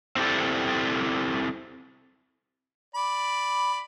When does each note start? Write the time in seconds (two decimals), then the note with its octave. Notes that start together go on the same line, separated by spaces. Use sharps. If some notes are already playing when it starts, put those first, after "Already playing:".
0.16 C4 E4 G4 A4 D5
2.95 D5 B5